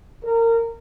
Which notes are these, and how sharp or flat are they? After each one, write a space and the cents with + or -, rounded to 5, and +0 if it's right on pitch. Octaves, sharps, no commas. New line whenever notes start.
A#4 -25